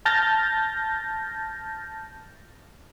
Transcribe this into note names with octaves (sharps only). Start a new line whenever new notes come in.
A5 F6 G6 A6 A#6